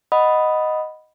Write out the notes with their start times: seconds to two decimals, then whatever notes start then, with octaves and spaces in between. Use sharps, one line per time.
0.12 D#5 F#5 B5 D#6